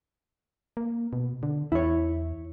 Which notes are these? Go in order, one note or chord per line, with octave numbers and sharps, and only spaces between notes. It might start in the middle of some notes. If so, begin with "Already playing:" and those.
A#3
B2
D3
E2 E4 C#5